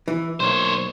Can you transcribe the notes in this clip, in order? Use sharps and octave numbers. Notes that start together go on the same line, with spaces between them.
E3
B1 A#3 C5 C#5